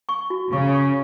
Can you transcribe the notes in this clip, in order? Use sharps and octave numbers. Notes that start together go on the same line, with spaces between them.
C#6
F#4
C#3 C#6
C#6